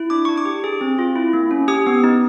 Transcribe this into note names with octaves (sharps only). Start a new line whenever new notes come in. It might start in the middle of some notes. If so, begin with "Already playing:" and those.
Already playing: E4
D4 D6
D4 C#6
D6
G4
G#4
C4
F4
E4
A#3
C#4
G4 D#6
B3
D#4